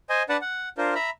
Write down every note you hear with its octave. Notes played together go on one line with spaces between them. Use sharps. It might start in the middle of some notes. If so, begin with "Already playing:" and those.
C5 D#5 G#5
D4 B4 D5 F#5 A5
F#5
D4 F4 A#4 C5
E5 A#5 B5